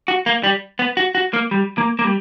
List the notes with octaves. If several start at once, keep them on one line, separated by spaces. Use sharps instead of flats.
F#4
A#3
G3
B3
F#4
F#4
A#3
G3
A#3
A#3
G3